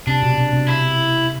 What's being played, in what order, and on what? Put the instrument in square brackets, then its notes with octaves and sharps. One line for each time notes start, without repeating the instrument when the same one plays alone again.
[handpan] C3 [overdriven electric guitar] D4
[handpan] B2
B2
C3
[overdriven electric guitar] E4